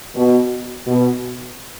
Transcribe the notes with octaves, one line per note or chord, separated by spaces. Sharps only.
B2
B2